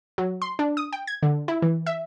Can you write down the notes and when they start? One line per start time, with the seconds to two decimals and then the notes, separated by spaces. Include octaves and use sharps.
0.18 F#3
0.42 C6
0.59 D4
0.77 D#6
0.93 G5
1.07 G#6
1.23 D3
1.48 E4
1.62 E3
1.86 E5